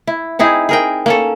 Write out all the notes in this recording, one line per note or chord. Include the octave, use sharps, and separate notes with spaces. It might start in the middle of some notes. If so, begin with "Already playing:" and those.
E4
C4 D#4 E4 G#4
G#4 A#4 G5
A#3 C#4 A4